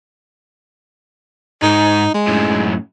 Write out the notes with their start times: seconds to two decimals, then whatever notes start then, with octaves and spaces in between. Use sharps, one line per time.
1.62 G#2 D#4
2.14 G#3
2.27 F#2 A2